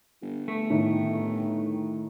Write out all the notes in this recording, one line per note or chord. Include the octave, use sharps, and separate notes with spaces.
G1
A3
A2 D#3